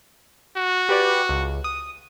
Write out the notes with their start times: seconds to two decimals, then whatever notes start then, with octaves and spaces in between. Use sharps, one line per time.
0.57 F#4
0.89 G4 B4 D5
1.29 C#2
1.64 D#6